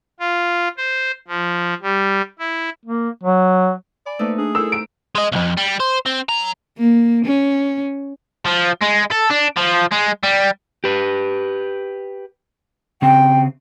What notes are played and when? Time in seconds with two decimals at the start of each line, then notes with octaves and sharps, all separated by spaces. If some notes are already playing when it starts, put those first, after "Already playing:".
0.20 F4
0.77 C5
1.28 F3
1.82 G3
2.39 E4
2.85 A#3
3.24 F#3
4.06 D5 G#5 B5 D6
4.19 A3 A#3 D#4 B4 C5
4.38 D4 G#4
4.55 E4 A4 A#4 C5 E6
4.72 A#5 D7
5.15 G#3 D#5
5.32 B1 F2
5.57 G3
5.80 C5
6.06 C4
6.29 F#3 A#5
6.78 A#3
7.25 C#4
8.46 F3
8.82 G#3
9.12 A4
9.31 D4
9.57 F3
9.92 G#3
10.23 G3
10.84 G4 B4
13.02 C#3 C4 G5